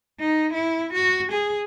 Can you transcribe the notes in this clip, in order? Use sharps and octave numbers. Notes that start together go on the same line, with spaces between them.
D#4
E4
F#4
G#4